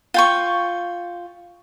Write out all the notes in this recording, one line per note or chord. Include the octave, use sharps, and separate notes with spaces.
F4 G5 C#6